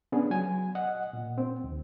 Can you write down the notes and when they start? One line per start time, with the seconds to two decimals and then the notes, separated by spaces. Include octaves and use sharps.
0.12 B3 C#4 D4 G#4
0.30 F#3 G#5
0.75 D#5 F#5
1.13 A#2
1.38 C4
1.64 D#2